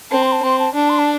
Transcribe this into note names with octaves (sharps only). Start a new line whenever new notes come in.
C4 A5
C6
A5
C4 C6
A5
D4 A5
C6
A5